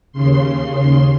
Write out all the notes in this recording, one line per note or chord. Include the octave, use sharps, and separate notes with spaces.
D#2 C#3 C6